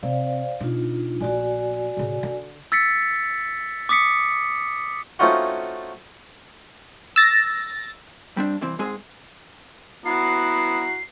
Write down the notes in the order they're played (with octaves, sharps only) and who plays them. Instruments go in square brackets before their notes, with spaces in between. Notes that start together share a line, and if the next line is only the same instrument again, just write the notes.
[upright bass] C3 [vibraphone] C5 D5 F5
[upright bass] B2 [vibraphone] D4 D#4 F4
[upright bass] A#1 A3 [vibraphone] F#4 D5 G#5
[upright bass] A2 C#3
D3
[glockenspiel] E6 A6 B6 C#7
D6 D#6 B6 C#7
[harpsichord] A3 C4 C#4 D#4 F4 F#4
[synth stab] E6 A6 A#6
[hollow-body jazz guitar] G3 C4 D4
C2 E3 C4
G#2 G#3 C4 G#4
[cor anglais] B3 [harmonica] E4 F#4 A#5 [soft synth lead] C7